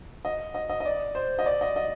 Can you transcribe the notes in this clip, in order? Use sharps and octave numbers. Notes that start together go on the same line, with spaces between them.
D#5
D#5
D#5
D#5
D5
C5
D#5
D5
D#5
D#5